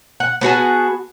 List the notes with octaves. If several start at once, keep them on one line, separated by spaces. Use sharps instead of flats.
F#5
B3 F#4 G#4 A5